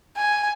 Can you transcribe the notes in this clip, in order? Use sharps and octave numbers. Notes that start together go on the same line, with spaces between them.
G#5